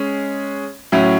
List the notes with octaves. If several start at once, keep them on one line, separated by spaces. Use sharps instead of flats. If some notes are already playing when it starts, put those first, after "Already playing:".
Already playing: G#3 C#4 G#4
A2 F#3 C#4 E4